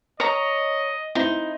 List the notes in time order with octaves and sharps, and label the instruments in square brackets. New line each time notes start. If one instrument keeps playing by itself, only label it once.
[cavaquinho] C#5 A#5 [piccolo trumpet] D#5
[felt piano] C4 E4 [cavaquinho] D#4